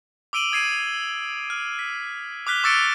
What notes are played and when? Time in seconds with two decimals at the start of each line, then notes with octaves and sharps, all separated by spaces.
0.33 D6 E6 D7 D#7 F#7
0.52 D#6 G#6 C7 D#7
1.50 F6
1.79 B6
2.47 D6 F6 F#6 B6 G7
2.63 C#6 D6 E6 A6 C#7 D7